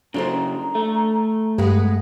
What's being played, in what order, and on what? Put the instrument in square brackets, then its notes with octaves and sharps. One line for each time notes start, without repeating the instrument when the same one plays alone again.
[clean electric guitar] C#3 F#3 [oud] D4 A4 C5 [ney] A#5
[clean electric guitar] A3
[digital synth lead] G2 [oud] G#3 B3